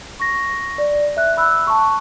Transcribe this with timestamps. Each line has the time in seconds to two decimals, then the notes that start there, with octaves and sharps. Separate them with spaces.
0.20 C#6 A#6
0.78 D5
1.17 E5 F#6
1.37 B5 E6 F#6
1.67 A5 C#6